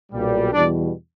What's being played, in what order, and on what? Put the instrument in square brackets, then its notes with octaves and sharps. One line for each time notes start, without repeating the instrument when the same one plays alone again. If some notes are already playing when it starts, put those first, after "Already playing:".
[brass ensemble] B1 A#2 G3
E2 B2 G3 D4 D5